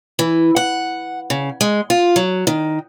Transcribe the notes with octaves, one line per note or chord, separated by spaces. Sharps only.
E3
F#5
C#3
G#3
F4
F#3
D#3